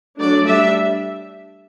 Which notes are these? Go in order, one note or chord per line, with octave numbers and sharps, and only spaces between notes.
F#3 A3 D4 D5
G3 D4 E5